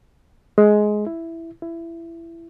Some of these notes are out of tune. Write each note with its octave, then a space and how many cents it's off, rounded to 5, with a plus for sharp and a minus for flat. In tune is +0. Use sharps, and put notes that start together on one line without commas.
G#3 +15
E4 +5
E4 +20